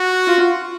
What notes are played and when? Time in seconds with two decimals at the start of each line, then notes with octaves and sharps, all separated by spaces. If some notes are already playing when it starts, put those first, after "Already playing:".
Already playing: F#4
0.27 F4